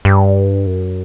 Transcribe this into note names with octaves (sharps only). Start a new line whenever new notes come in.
G2
F#2